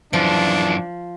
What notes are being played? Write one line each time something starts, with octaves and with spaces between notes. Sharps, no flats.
F#2 E3 F3 D4